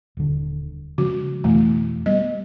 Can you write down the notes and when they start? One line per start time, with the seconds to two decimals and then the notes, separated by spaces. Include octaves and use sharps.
0.17 D#1 D3
0.98 C#3 F3 G#3 F#4
1.44 F2 B2 E3 A3
2.06 G3 B3 D#5